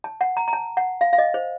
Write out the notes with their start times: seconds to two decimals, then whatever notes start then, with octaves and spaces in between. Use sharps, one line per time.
0.04 A5
0.21 F#5
0.37 A#5
0.48 A#5
0.53 A5
0.77 F#5
1.01 F5
1.13 F5
1.18 D#5
1.34 C5